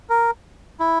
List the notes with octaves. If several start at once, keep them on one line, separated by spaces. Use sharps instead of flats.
A#4
E4